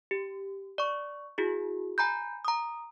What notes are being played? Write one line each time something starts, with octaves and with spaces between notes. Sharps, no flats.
G4
D5 C#6
E4 F#4 G#4
G#5 A#5 B5 G6
A#5 D#6